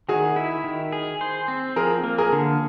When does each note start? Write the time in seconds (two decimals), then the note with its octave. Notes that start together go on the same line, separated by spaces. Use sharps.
0.08 D#3 F#4 G#4
0.36 E4
0.64 D#3
0.92 G#4
1.21 C5
1.48 C4
1.76 F3 G#4 A#4
2.04 A#3
2.18 G#4 A#4
2.32 D3